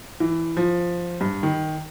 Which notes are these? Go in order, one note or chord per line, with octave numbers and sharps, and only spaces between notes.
E3
F3
G2
D#3